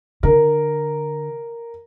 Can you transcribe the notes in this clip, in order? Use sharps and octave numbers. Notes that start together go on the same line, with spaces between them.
D3 A#4